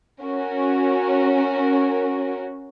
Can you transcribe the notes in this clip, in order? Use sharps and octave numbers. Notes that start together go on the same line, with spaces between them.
C#4 F#4 A#4